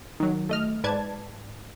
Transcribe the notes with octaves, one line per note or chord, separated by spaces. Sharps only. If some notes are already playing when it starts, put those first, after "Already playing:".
D#3 F#3
A3 D#5 F6
G#2 B4 D5 A5 G#6